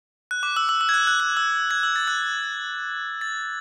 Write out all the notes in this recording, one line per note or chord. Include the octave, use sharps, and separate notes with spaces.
F#6
D6
E6
E6
E6
G#6
F#6
F#6
F#6
E6
G#6
E6
A6
F#6
A6